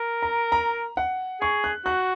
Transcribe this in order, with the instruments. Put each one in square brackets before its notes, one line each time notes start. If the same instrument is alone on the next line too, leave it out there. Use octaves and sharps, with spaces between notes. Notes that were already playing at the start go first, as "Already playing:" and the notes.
Already playing: [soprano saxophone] A#4
[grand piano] A#5
A#5
F#5
[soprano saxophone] G#4 [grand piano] C#6
[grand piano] F#6
[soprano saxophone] F#4 [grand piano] F#6